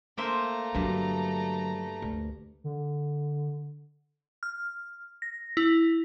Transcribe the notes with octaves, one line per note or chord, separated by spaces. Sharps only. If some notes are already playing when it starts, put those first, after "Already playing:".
A3 A#3 C5 E5 A#5
G2 D3 F#3
D2
D3
F6
A#6
E4